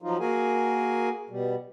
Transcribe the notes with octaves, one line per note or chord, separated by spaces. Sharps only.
F3 F#3 D#4 F4
A#3 F#4 G#4 A#4 G#5
B2 G3